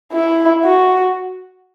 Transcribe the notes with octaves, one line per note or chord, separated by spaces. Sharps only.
E4
F#4